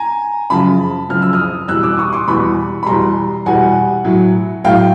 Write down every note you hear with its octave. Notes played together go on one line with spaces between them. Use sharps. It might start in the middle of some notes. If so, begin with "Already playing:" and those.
Already playing: G#5 A#5
F#2 C#3 F3 A5 B5
F#2 C#3 F3 F6
E6
D#6 F6
E2 B2 G3 E6 F#6
D6 E6
C#6 D#6
C6 D6
E2 B2 G3 B5 C#6
B5
E2 B2 G3 A#5 C6
E2 B2 G3 F#5 G#5
A2 F#3
A2 F#3 F5 G5